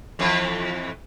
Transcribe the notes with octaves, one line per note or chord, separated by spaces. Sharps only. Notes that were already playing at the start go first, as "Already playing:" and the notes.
F2 E3